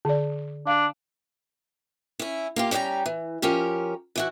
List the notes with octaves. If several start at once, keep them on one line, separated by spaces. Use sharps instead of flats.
D3 D5
D4 F5
C#4 E4
A#3 F4 G4
G3 C#4 D5 G5 A#5
E3
F3 C#4 G4 A#4
E3 E4 F#4